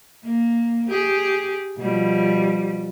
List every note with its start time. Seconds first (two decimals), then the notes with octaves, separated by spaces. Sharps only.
0.23 A#3
0.88 G4 G#4
1.78 B2 F3 G3